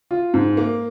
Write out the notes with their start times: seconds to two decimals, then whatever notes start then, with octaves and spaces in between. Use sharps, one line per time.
0.11 F4
0.34 G#2
0.57 A#3